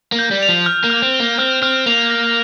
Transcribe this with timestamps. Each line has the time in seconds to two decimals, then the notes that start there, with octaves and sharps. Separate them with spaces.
0.12 A#3
0.19 G6
0.31 G3
0.43 F7
0.49 F3
0.66 F6
0.84 A#3
0.90 F6
1.02 C4
1.14 G7
1.20 A#3
1.38 C4 F6
1.62 C4 F6
1.86 A#3 F7
2.10 A#6